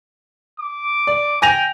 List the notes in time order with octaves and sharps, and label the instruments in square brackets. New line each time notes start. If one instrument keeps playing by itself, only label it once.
[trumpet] D6
[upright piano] D5
[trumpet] G5 [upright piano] G#5 A#6 F7